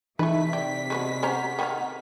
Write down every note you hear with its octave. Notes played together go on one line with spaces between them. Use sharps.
C3 E3 A3 D#4 B4 E5 B6
G4 D5
G#3 A3 B3 F#4
C#4 C5 F#5 A#5
D#3 G#4 F5